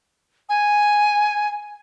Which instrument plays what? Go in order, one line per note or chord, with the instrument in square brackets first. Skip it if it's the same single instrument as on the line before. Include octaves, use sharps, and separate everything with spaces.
[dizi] G#5